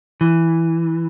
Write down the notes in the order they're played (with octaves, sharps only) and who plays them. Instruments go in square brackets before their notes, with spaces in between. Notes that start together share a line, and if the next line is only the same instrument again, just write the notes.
[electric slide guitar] E3